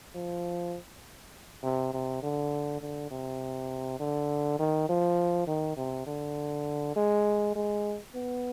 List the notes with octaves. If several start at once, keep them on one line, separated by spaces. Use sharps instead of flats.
F3
C3
C3
D3
D3
C3
D3
D#3
F3
D#3
C3
D3
G#3
G#3
B3